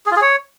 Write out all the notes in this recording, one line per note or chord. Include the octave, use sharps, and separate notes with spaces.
G#4
F4
G#4
C#5